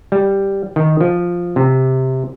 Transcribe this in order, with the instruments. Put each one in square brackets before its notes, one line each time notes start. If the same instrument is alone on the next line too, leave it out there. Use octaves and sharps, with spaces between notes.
[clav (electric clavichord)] G3
D#3
F3
C3